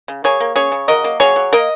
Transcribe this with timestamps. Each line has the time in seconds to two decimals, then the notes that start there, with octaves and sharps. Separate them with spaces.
0.08 C#3
0.24 A#3 G#4 C#5
0.40 A#3
0.56 C#4 G#4 C#5
0.72 C#3
0.88 F#3 A#4 D#5
1.04 A#3
1.20 F#3 G#4 C#5
1.36 F#3
1.53 A#3 A#4 D#5